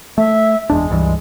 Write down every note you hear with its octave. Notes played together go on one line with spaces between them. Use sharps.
A3 E5
F#1 E2 G#3 D4
C#2 G2 E3